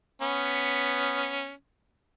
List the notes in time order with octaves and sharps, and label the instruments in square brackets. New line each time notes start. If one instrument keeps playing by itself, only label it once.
[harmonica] B3 C#4